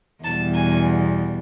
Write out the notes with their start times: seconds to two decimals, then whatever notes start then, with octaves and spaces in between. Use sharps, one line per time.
0.24 E2 B2 G3 A5
0.55 G#5